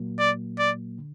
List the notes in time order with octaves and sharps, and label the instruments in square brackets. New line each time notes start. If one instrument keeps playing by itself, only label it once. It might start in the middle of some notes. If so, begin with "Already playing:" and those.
Already playing: [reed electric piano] A#2 F#3 A#3
[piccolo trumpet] D5
D5
[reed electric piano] D3